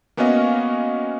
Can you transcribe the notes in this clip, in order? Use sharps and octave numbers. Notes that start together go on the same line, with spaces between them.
A#3 B3 C#4 F#4 D#5 F5